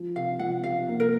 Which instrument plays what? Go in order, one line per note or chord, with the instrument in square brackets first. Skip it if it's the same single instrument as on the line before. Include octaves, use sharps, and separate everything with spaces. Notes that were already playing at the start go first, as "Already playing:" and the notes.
Already playing: [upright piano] F3
[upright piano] C3 [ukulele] F5
[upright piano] F3 [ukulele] F#5
[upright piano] C3 [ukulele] F5
[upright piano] A#3
[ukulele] A#4